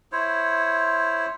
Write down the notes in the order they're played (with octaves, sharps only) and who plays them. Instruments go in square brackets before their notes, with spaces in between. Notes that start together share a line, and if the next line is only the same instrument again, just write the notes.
[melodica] E4 C5 C#5